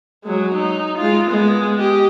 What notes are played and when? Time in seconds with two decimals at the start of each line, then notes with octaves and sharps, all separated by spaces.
0.24 F#3 G#3
0.54 D#4
0.98 G#3 F4
1.30 G#3 B3
1.79 G4 D#5